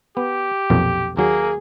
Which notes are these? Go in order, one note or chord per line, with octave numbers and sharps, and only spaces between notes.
B3 G4
B1 F2 A#2
D#2 F#3 A#3 G#4